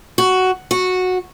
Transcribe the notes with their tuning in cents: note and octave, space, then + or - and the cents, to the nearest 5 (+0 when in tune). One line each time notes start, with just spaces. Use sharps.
F#4 +5
F#4 -10